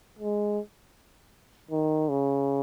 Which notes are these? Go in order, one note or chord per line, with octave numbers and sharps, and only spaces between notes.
G#3
D#3
C#3